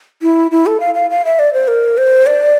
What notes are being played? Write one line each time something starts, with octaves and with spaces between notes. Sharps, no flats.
E4
E4
A4
F5
F5
F5
E5
D5
C5
A#4
C5
D5